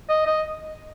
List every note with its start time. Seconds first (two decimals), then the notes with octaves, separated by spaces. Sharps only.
0.10 D#5
0.27 D#5